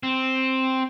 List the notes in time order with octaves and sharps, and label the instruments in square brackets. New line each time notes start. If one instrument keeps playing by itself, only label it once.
[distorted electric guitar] C4